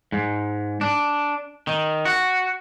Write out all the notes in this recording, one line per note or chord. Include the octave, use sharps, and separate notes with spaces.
G#2
D4
D#3
F#4